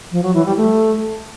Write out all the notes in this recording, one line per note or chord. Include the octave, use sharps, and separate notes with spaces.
F3
F#3
E3
G3
A3